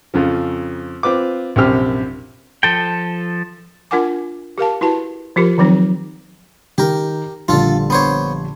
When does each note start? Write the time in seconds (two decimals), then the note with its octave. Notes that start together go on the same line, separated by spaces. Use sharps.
0.14 F2 C#3 F3
1.03 C4 F4 B4 D6
1.56 A#1 F#2 C3 C4 G4 F6
2.63 F3 A4 G5
3.91 D4 F4 A#4 F#5 G#5 D6
4.58 G4 A#4 F5 A5
4.81 E4 F#4 B4 A5
5.36 F3 F4 G4 A#4
5.58 D#3 F3 F#3 C4 D#4
6.78 D#3 G4 A#4
7.48 A#1 D3 G3 F4 A4
7.90 B3 C5 C#5